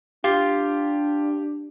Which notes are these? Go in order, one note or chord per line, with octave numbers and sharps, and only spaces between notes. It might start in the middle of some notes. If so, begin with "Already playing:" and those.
D4 F4 G4